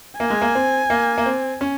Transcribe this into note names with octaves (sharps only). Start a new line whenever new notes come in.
A#3 G#5
G#3
A#3
C4
A#3
A#3
C4
C#4